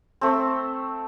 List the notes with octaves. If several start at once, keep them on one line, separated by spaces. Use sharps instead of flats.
A3 C4